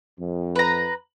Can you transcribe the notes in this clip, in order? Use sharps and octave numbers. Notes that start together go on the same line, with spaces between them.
F2
B4 A#5